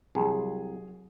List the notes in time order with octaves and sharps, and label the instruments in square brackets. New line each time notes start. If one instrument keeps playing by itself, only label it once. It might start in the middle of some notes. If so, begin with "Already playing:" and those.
[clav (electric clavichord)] C2 [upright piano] F#3 G#4